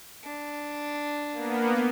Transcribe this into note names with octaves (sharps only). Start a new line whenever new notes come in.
D4
A#3 B3